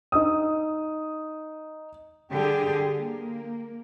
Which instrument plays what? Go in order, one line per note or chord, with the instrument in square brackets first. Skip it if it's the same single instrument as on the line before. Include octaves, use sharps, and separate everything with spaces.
[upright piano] D#4 D#6
[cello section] D3 G3 G4 G#4
A#3